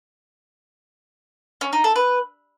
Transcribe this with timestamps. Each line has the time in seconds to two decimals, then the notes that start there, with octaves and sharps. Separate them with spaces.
1.61 C#4
1.73 D#4
1.84 A4
1.96 B4